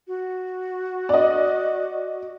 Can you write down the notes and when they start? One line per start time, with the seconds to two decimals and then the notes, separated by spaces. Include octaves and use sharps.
0.08 F#4
1.09 D5 D#5